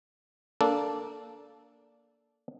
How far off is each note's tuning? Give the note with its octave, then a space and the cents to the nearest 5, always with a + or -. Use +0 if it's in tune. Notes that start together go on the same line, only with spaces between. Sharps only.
A#3 +0 D4 -15 A4 -5